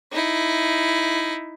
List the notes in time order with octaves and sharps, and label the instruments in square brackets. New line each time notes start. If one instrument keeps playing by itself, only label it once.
[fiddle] D#4 E4